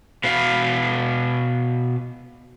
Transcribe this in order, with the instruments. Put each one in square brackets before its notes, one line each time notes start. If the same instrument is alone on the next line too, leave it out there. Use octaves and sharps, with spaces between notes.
[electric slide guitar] B2 B4 F5